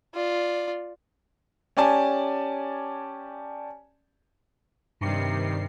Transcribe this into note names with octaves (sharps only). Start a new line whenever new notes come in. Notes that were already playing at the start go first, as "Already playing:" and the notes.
F4 D5
C#4 G4 D5 G#5 A5
G2 C3 D#3 G3 C7